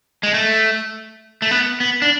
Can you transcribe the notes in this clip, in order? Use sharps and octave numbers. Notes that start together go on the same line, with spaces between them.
G#3
A3
A3
B3
B3
D4